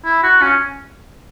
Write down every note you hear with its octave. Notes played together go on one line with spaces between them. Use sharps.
E4
F#4
C#4